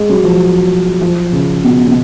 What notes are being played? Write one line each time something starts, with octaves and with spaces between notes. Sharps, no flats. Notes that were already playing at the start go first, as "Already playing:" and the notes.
Already playing: G#3
F#3
F3
F3
C#3
B2
B2